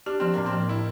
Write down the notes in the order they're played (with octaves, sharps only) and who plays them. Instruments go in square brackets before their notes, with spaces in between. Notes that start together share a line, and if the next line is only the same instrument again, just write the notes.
[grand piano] D4 [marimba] G4
[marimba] F3 [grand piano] C4
[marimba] A2 [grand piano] A#3
[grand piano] C4
[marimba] F3
[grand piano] E4